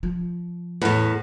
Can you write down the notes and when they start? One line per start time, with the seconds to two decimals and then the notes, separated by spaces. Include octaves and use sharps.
0.03 F3
0.82 E2 A2